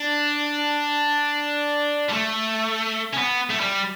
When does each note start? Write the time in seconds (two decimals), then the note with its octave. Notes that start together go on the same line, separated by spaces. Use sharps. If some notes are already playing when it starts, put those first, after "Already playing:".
Already playing: D4
2.09 G3
2.13 A3
3.13 C#4
3.17 B3
3.50 A3
3.60 G3